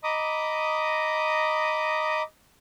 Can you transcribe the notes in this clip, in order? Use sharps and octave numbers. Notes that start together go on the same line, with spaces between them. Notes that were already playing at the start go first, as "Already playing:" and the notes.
D#5 A#5 B5 D6 D#6